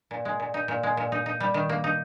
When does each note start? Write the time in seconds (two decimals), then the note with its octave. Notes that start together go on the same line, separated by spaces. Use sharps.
0.11 A#2
0.25 G#3
0.40 A#2
0.54 D#4
0.68 A#2
0.83 G#3
0.97 A#2
1.12 D#4
1.26 D#4
1.40 G3
1.54 D#3
1.69 A#3
1.84 D#4